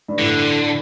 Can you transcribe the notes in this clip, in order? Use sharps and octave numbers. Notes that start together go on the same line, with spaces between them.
G2
A2 D3